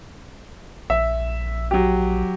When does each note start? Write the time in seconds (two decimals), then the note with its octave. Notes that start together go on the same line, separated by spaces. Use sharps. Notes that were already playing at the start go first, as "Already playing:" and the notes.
0.90 A#1 E5
1.71 F#3 G4